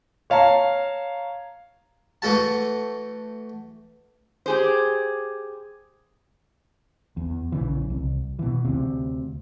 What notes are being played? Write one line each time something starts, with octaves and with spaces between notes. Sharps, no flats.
C#5 F5 A5 A#5
E3 A3 F#4 A5
G4 G#4 C5
E2
A#1 C#3 E3
C2
B2 E3
D2 C3